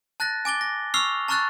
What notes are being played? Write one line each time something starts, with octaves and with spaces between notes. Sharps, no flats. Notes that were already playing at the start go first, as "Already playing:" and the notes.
A5 F#6 A6 A#6
G#5 D6 A6 G7
A#6
C#6 E6 F6 C7 F7 G7
A5 A#5 C#6 F6 F#6 A6